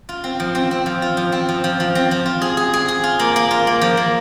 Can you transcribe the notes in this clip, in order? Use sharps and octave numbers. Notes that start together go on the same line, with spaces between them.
F4
C4
F3
C4
C4
F3
F4
F3
C4
F3
F3
F3
C4
F3
F4
G#4
G#4
G#4
G#4
F4
A#3
A#3
F4
A#3
F3
A#3